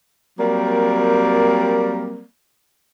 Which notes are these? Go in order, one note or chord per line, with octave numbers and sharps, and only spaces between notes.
F#3 G3 A#3 C4 A#4 D5